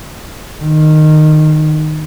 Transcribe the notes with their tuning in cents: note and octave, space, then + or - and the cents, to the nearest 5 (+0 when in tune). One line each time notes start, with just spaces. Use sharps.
D#3 -15